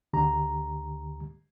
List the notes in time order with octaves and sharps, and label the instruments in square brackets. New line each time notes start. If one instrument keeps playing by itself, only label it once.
[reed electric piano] D2 D3 G4 A#5